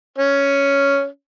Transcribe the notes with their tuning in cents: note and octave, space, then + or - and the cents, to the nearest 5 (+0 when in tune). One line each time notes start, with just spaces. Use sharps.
C#4 +5